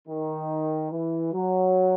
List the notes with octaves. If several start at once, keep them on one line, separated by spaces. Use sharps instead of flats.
D#3
E3
F#3